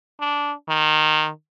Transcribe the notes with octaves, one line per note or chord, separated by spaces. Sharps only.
D4
D#3